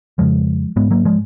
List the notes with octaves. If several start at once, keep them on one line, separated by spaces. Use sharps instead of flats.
F2 C#3 F3 G#3
G#2 G#3 B3
F#3 A#3
F3 G#3